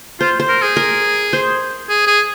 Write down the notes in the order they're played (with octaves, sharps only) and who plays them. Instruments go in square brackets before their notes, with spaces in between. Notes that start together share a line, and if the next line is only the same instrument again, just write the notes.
[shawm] F4 [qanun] C5
[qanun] C5
[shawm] A#4
G#4
[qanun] A#4
C5
[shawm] G#4
G#4